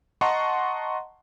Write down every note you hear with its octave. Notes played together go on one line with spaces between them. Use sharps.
D#5 F#5 A5 A#5 C6 C#6